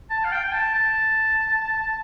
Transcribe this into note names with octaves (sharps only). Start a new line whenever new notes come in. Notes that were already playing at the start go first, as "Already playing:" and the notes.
A5
F5
G5
G5
A5
A5